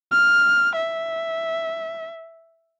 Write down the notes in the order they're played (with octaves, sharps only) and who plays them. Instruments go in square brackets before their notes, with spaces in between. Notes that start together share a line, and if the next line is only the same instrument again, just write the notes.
[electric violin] F6
E5